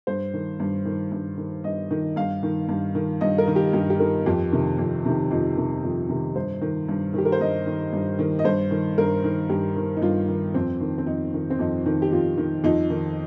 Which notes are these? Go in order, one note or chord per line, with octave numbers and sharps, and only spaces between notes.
G2 C5
D#3
G2
D#3
G2
D#3
G2 D#5
D#3
G2 F5
D#3
G2
D#3
G2 D#5
A#4
D#3
G4
G2 G4
G4
D#3 A#4
F2 G4
C3 D#3
F2
C3 D#3
F2 D#4
C3 D#3
F2
C3 D#3
G2 C5
D#3
G2
D#3 G4
A#4
C5
G2 D#5
D#3
G2
D#3
D#5
G2 C5
D#3
G2 A#4
D#3
G2 G4
D#3
D#4
G2 F4
D#3
F2 C4
D#3
C4
F2 D#4
D#3
C4
F2 D#4
D#3
G4
F2 F4
D#3
F2 D#4
D#3